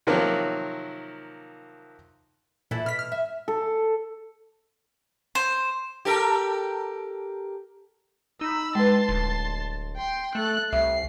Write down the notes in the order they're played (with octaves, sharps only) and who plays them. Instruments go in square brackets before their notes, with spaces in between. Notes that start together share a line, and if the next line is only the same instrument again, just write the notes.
[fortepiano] C3 D#3 F3 F#3 A#3
[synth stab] A#2 [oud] E3 E4 A4
[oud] B2 [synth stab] F6 B6
[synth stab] F6
[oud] E5
[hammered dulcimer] A4
[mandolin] C5
[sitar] G4 A4 A#4
[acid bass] D#4 [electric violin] B5 E6
[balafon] G#3 B4 [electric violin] A5 C6
[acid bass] D1
[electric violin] G5 C6
[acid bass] A3 [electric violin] A4 F#6
[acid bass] C2 [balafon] E5 [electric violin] C7